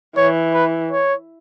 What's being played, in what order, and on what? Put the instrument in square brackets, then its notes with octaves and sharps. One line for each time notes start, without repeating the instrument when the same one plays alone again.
[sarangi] E3 [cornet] C#5
[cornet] B4
C#5